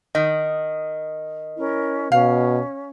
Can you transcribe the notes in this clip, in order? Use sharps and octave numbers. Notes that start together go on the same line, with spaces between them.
D#3 D#5
C#4 E4 A#4
B2 C#4 F5